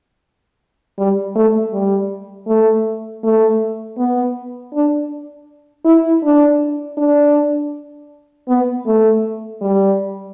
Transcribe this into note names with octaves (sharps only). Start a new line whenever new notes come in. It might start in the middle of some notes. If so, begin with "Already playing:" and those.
G3
A3
G3
A3
A3
B3
D4
E4
D4
D4
B3
A3
G3